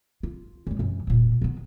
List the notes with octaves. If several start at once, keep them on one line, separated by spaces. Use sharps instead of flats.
F4
F1 G#3
F#2 E3
E1 A#2
D#3 B3